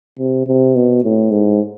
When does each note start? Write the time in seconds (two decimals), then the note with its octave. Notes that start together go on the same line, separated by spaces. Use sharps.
0.19 C3
0.47 C3
0.76 B2
1.03 A2
1.31 G#2